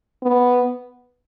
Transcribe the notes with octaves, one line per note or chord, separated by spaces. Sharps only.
B3